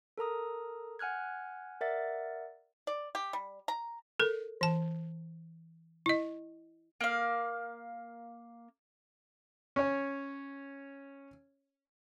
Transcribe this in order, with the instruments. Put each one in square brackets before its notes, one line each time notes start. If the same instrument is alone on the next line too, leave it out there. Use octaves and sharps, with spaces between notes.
[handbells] A4 A#4 A#5 D#6
F#5 G#5 F6 F#6 G#6
A#4 D5 E5 F#5 A6
[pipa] D5
G4
G3
A#5
[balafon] A4 A#4
E3 A5
E4 D#5
[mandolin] A#3 F5
[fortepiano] C#4 C#5